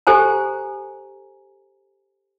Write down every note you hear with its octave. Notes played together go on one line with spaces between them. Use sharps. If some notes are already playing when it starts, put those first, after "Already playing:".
G4 A4 C5 G#5 A#5